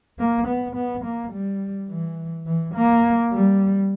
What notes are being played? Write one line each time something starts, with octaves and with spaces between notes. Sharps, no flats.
A#3
B3
B3
A#3
G3
E3
E3
A#3
G3